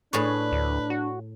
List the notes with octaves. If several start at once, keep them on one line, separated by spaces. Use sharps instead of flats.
A2 D4 G#4 B4 C#5
D2
F#4